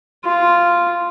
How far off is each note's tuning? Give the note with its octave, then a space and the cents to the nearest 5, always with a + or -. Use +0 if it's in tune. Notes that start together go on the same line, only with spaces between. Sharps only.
F4 -5